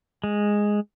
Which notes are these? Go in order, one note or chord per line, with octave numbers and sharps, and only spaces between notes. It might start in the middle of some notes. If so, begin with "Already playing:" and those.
G#3